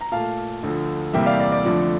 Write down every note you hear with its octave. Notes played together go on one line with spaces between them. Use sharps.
A#5
A#2 A3 F5 A5
D2 D3 F3
E2 C3 G3 A#3 E5 G5
D5 F5
D5
D5
F2 D3 F3 A3